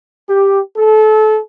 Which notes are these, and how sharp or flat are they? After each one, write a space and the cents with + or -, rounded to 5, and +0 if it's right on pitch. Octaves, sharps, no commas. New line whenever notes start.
G4 +5
A4 -25